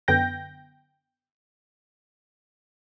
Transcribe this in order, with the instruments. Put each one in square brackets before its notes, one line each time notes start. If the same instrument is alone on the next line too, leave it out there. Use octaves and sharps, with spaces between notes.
[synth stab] F#2 D3 B3 G5 G6 A#6